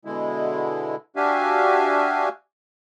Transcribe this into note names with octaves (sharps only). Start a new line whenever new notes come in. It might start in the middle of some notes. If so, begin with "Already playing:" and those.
B2 D3 G#3 E4
D4 F#4 G4 E5 F5 G#5